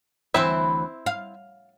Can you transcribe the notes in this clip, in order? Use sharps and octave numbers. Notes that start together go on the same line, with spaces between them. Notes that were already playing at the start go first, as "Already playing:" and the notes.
D2 E3 C4 E4 C5 E5
F5